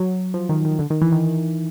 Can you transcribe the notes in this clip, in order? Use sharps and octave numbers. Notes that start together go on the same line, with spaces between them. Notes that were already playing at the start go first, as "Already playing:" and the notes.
Already playing: F#3
F3
D#3
D#3
D3
D#3
E3
D#3